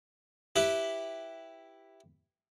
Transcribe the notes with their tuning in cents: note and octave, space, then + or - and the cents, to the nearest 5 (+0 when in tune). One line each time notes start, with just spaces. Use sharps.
E4 +0 G4 +0 B4 +0